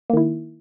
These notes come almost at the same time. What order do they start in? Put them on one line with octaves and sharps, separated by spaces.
A#3 D#3 E4